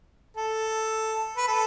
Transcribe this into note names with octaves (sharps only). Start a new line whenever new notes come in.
A4
B4
A4